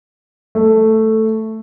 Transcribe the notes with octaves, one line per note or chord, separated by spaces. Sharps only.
A3